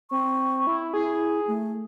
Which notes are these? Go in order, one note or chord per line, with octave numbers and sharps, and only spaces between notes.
C4 C#6
E4
E4 G#4
A3